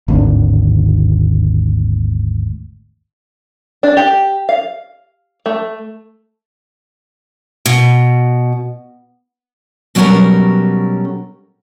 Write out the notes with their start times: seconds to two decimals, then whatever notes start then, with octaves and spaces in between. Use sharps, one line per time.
0.08 G#1 D#2 A2 D3
3.83 D4
3.97 G4
4.49 F5
5.46 A3
7.66 B2
9.95 B2 F#3 G3 C#4 A4 A#4